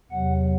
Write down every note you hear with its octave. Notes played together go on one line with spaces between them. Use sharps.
E2 C3 F#3 F#5